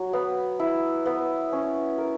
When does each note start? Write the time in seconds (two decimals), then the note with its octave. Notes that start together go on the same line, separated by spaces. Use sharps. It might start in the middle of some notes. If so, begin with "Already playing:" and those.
Already playing: F#3
0.13 B3
0.59 E4
1.06 B3
1.52 C#4
1.98 A#4